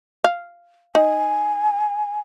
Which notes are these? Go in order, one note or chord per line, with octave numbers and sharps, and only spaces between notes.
F5
D#4 G#5